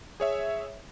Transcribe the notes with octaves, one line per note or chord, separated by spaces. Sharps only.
G#4 C#5 E5